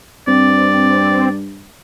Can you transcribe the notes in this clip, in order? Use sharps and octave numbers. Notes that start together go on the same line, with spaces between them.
G2 C4 D5